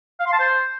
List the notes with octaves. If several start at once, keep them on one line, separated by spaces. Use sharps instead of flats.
F5
C6
A5
C5